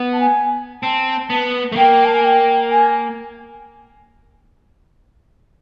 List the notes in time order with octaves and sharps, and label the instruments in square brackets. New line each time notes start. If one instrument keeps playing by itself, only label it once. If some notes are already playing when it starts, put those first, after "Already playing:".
Already playing: [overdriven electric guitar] B3
[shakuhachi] A5
G#5
[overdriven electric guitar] C4 [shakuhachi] A5
[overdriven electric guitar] B3
A3
[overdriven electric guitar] A#3 [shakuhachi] G5
[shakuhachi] A5
G#5
G5
G#5